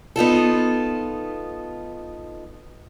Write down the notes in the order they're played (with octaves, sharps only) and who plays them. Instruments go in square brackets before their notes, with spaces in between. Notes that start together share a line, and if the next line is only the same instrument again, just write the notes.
[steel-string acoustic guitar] B3 D#4 F4 A4